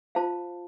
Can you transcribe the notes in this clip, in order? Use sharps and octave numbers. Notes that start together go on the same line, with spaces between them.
F4 C5 F5 A5